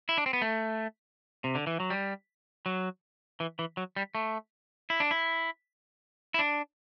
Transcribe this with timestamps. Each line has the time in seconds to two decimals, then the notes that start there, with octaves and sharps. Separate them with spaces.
0.09 E4
0.18 D4
0.26 C4
0.33 B3
0.42 A3
1.44 C3
1.55 D3
1.67 E3
1.80 F#3
1.90 G3
2.66 F#3
3.40 E3
3.59 E3
3.77 F#3
3.96 G3
4.15 A3
4.90 E4
5.00 D4
5.11 E4
6.34 E4
6.39 D4